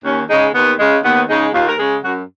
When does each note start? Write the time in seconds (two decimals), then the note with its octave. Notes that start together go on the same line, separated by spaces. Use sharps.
0.05 D#2 C#4
0.29 C#3 G#3 D#4
0.55 D#2 B3
0.79 C#3 G#3
1.04 D#2 B3
1.29 C#3 G#3 D#4
1.54 D#2 F4
1.68 A#4
1.79 C#3 G#3 G#4
2.04 F#2 F#4